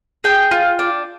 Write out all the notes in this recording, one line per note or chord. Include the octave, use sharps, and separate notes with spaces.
G#4 G5
F4
D4